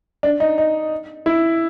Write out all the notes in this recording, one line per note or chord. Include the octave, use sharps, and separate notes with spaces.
D4
D#4
D#4
E4